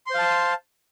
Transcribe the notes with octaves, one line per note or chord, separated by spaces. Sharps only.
C5 F5 A5 C6